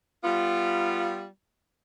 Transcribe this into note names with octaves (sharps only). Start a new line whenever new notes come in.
G3 B3 F4